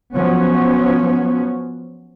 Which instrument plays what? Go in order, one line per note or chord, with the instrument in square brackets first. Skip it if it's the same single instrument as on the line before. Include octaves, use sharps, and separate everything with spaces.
[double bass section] F3 F#3 B3 C#4